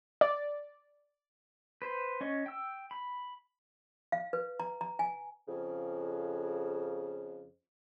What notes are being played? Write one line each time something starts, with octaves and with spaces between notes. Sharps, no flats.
D5
B4 C5
C#4 D#5 C#6
G5 E6
B5
F5
B4
A#5
A#5
G#5
F2 C#3